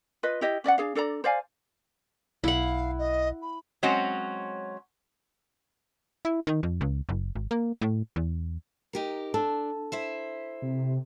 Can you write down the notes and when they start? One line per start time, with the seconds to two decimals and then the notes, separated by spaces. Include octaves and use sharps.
0.23 F4 B4 D#5
0.41 E4 G4 D#5
0.64 C#4 D5 D#5 F#5
0.78 D4 G#4 F5
0.95 D4 A4 D5 A#5
1.24 C5 D5 F5 G#5
2.44 B1 E4 F5 F#5
2.98 D#5
3.42 B5
3.83 F#3 G#3 C4 C#4 F#4 F#5
6.25 E4
6.47 D#3
6.63 F2
6.81 C#2
7.09 F#1
7.35 G#1
7.51 A#3
7.81 A2
8.16 E2
8.93 D#4 G4 A#4
9.34 D4 A4
9.92 E4 C5 E5
10.62 C3